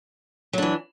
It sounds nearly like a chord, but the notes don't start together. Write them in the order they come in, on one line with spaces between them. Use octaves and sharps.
F#3 D4 E3